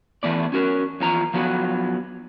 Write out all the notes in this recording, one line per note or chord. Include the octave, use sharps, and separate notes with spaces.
E3 A3 B3 D5
C#4 F#4 A#4
E2 F3 A#5
F3 F#3 B3 F#4